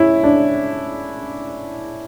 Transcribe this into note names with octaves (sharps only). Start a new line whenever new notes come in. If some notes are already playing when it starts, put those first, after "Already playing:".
Already playing: C#4 E4
D4